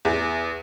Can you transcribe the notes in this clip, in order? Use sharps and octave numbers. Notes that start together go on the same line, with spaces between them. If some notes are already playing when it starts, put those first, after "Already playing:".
E2